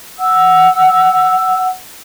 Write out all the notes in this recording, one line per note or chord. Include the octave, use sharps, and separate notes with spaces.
F#5 E6